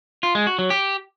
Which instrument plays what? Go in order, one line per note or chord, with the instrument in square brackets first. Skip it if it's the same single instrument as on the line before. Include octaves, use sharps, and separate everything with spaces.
[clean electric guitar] F4
G#3
F#4
F#3
G4